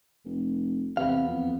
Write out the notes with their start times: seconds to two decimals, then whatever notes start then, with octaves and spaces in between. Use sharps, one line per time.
0.25 F1
0.97 E2 C3 B3 F5
1.27 F2